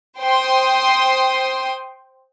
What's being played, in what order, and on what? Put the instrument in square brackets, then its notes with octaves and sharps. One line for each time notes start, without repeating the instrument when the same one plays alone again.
[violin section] C5 G5 C6 D#6